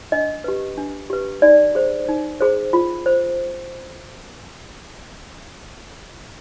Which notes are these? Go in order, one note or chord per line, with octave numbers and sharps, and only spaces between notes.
D4 D#5
G4 B4
D4
G4 B4
D#4 D5
G#4 C5
D#4
G#4 C5
F4
C5